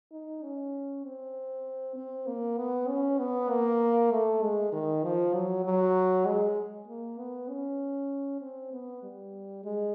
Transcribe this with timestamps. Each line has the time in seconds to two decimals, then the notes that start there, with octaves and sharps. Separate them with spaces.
0.12 D#4
0.43 C#4
1.04 C4
1.96 C4
2.27 A#3
2.58 B3
2.89 C#4
3.19 B3
3.50 A#3
4.12 A3
4.42 G#3
4.72 D#3
5.03 F3
5.35 F#3
5.65 F#3
6.26 G#3
6.88 A#3
7.18 B3
7.49 C#4
8.41 C4
8.72 B3
9.03 G3
9.64 G#3